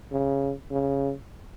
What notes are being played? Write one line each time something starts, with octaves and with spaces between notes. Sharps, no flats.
C#3
C#3